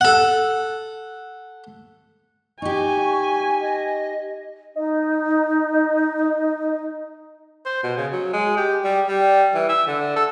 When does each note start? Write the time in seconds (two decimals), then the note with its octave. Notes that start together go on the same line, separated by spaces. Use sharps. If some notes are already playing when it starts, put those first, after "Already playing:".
0.01 A4 F#5
2.62 D#4 G4 G#5 C#6
3.61 D#5
4.76 D#4 D#5
7.66 C5
7.84 B2
7.97 C#3
8.13 F#3
8.33 G#3
8.57 G4
8.84 G3
9.07 G3
9.55 E3
9.69 E5
9.87 D3
10.16 A4